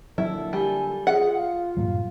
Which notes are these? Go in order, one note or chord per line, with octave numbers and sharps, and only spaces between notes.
A#2 D3 F#3 E4 A4
G3 G#5
F4 G#4 F#5
F5
G2 A#2 F#3 F5